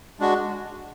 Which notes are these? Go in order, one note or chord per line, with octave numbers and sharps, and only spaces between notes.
G#3 D4 F#4